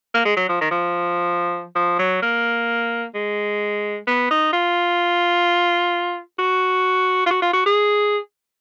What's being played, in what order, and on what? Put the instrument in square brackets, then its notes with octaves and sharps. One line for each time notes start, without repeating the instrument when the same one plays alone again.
[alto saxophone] A#3
G#3
F#3
F3
D#3
F3
F3
F#3
A#3
G#3
B3
D#4
F4
F#4
F4
F#4
F4
F#4
G#4